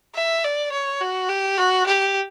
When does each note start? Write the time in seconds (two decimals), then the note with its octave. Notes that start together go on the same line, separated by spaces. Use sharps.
0.15 E5
0.44 D5
0.72 C#5
1.01 F#4
1.29 G4
1.58 F#4
1.86 G4